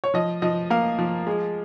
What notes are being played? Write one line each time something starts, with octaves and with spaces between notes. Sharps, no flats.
C#5
F3 D#5
F3 D#5
A#3 F5
F3
G#3